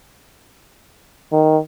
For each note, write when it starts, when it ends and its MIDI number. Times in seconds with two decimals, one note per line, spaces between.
1.32 1.58 51